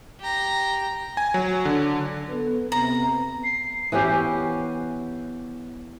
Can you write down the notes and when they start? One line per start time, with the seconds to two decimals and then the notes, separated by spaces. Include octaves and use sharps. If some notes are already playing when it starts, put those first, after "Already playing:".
0.20 G4 A#5
1.17 G#5
1.34 F#3
1.65 D3
2.29 B3 A4 B4
2.72 C3 B3 A#5
3.44 C7
3.92 E3 B3 C#4 G4